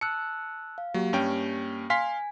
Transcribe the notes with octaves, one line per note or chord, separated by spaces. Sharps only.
A5 E6 F#6 C#7
F5
F#3 A#3 G4
G2 C#4 G5
F5 G#5 C6 B6